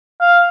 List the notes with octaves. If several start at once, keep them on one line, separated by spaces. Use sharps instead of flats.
F5